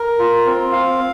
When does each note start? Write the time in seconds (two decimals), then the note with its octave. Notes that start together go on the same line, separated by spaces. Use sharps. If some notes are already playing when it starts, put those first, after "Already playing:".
Already playing: A#4
0.19 F4
0.46 C4
0.72 F5